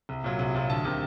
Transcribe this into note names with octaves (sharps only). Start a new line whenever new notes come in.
C2
A#2 F#3
C2
A#2 F#3
D2 A5
C3 D#3